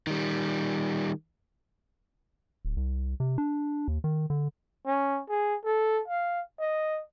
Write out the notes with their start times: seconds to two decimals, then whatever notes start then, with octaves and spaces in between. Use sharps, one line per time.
0.07 D#3 G3
2.65 D1
2.77 C2
3.20 C3
3.38 D4
3.88 D#2
4.04 D#3
4.30 D3
4.86 C#4
5.30 G#4
5.65 A4
6.08 F5
6.60 D#5